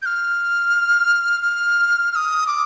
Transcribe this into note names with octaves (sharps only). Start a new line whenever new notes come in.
G6
F6
F6
F6
D#6
D6